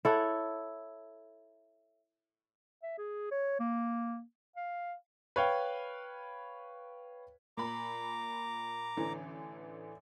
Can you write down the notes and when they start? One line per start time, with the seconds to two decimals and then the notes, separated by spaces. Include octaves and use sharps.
0.05 E4 A4 C#5 F#5
2.83 E5
2.98 G#4
3.31 C#5
3.60 A#3
4.56 F5
5.36 B4 C#5 F5 G5
7.57 A#2 A#5 B5 D6
8.97 A1 D3 E3